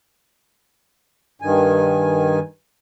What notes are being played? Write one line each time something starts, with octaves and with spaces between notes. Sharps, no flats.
G2 D#3 G#5